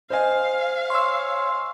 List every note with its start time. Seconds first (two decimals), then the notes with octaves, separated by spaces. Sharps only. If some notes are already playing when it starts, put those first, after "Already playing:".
0.10 C5 D#5 F5 G#5
0.90 C#5 C6 E6